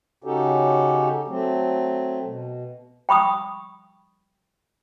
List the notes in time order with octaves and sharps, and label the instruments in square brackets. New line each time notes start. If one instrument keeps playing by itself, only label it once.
[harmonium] C#3 C#4 D#4 F#4 G4 A4
F#3 A3 C4
B2
[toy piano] G5 B5 C#6 D#6